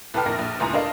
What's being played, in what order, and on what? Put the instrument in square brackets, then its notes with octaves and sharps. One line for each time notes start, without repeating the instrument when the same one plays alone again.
[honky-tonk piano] C2 A4 B4 G5 F6
A#1 F2 A#4 A#6
A#1
G1 C#2 A2 G#5 A#5
D4 A4 A#4 D#5 F5